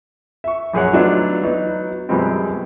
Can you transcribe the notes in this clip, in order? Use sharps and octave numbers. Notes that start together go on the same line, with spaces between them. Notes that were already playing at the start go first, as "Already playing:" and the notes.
E5 C#6
A#1 F#2 G#4 C#5 F#5
F#3 A3 B3 D4 D#4 F4
F#3 B3 D#4
F#2 B2 F3 G3 G#3 C4